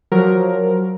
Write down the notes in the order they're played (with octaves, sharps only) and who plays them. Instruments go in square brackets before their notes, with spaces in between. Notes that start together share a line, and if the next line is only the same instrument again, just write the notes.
[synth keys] F3 F#3 A#4